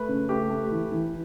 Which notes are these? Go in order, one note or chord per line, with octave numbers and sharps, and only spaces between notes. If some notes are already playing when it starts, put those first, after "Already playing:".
Already playing: A3 B4
C#3
A3 G4
A3
E3
E3